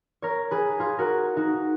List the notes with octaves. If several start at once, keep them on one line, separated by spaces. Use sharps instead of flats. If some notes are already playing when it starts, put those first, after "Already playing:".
A#4 C#5
G#4 B4
F4 G#4
F#4 A#4
D#4 F#4